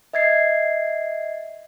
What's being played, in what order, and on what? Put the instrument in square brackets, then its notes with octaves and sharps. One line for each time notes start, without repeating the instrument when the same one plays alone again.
[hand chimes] D#5 E5 G#6 A6 C7